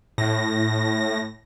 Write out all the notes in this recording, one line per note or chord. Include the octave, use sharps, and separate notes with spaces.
A2 A#6